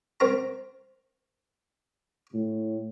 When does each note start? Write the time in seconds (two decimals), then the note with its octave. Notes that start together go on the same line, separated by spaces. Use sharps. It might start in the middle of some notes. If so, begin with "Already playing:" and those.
0.20 C4 A#4 A#5
2.34 A2